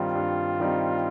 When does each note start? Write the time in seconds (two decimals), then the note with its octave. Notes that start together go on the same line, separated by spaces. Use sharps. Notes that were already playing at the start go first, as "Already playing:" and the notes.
Already playing: G2 D#3 G3 C4 D#4 F4
0.15 G2
0.59 D#3 G3 C4 D#4